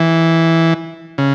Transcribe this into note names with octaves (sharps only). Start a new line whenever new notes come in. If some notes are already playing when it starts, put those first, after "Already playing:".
Already playing: E3
C#3